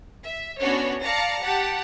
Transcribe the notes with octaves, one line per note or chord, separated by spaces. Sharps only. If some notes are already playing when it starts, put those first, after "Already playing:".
E5
B3 C#4 D4 F#4 C#5
D5 F5 A5 A#5 A#6 C#7
G4 F#5 A5